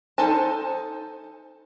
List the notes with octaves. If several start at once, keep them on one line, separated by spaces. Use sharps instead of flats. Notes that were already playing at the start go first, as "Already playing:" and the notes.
D#4 A4 C5 G#5 A5